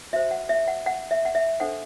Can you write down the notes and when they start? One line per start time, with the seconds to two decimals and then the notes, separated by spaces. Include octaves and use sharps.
0.13 F#4 C5 E5
0.31 F#5
0.49 E5
0.68 F#5
0.86 F#5
1.11 E5
1.25 F#5
1.35 E5
1.60 D4 A4 C5 F#5